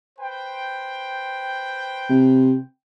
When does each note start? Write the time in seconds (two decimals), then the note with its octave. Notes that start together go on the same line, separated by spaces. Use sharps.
0.19 B4 C5 G5
2.10 C3